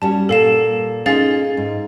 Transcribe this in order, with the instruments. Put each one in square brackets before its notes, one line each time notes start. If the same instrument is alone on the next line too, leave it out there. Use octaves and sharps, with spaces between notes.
[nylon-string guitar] G3 C#4 F#4 [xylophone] A5
[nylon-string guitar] A#2 [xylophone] A4 F5 E7
[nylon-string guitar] C#4 D#4 F4 [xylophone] G#4 F5 A6
[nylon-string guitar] G#2